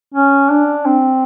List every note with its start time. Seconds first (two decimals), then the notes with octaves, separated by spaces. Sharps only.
0.14 C#4
0.50 D4
0.86 C4